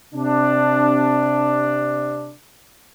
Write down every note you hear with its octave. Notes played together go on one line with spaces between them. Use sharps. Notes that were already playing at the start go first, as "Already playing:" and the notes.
C3 D4